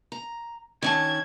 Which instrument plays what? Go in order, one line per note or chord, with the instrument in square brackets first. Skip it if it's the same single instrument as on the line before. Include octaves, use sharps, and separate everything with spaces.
[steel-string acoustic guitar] A#5
[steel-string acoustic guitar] D#3 C#4 A5 [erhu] G#6